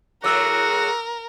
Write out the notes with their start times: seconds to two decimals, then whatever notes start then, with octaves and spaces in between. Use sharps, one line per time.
0.24 A2 F#3 G#3 F#4 A#4 D6 E6 F#6